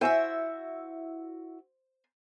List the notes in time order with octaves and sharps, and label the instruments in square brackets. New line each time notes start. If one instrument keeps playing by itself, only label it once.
[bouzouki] E4 F#4 E5 [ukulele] C5 G#5